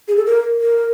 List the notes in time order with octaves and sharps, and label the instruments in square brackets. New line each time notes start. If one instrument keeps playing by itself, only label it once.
[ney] G#4
A4
A#4
A#4